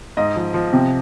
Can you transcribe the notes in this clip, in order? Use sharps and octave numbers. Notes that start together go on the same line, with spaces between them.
G#2 D#5
F3
F3
C3